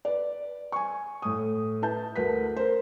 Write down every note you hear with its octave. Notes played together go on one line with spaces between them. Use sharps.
B4 D5
G#5 C#6
A2 D#6
E4 B4 A5 G6
D2 A#4 B4 B6
A#4 C5